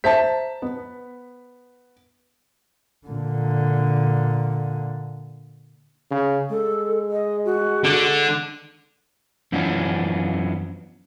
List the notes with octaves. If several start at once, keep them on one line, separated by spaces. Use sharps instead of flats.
C5 E5 A5 A#5 B6
B3
A#2 D3
C#3
G#3 A4
D#5
F#4
D3
F#2 E3 F3 B3 C#4 D4